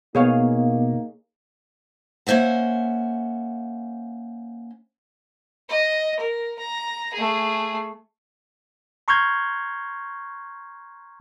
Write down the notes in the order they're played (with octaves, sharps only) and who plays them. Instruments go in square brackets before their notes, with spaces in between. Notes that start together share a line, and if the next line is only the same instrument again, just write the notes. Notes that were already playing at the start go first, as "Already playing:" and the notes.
[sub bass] B2 [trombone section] A#3 D#4 [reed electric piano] B3 [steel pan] G#4 C#5 F5
[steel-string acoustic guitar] A#3 C#4 C5 E5 F#5
[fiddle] D#5
A#4
A#5
A3 G#4
[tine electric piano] A#5 C6 C#6 F6 G6 G#6